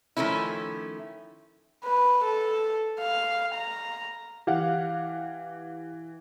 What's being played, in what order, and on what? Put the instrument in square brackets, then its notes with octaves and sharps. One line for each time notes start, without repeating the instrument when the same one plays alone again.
[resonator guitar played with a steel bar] D#3 F3 A3 C#4 E4
[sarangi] B4
A4
F5
A#5
[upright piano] E3 [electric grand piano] G4 F5 F#5